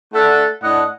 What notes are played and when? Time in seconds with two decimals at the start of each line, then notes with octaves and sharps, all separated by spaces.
0.14 A3 D4 A4 E5 F#5
0.62 A2 D4 D#5 F#5